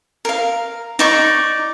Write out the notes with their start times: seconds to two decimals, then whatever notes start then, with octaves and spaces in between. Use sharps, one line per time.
0.25 A#4 F5
0.99 D#4 D5 C#6